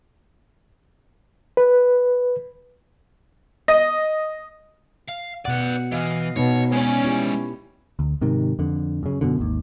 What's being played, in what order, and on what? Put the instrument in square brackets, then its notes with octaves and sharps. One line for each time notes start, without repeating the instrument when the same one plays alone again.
[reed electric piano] B4
[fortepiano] D#5
[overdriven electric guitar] F5
[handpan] B2 F#5 [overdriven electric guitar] B4 D5
[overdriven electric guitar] E3 [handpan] D#5 F5
[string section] B2 [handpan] B3 D#4 [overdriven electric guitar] C#5
[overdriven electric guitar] G#3 D5 [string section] C#4
[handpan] E4 G4
[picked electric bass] D2
G#2 C3 D#3
F2 D3
F#2 C#3
F#2 B2 D3
G#1 D#2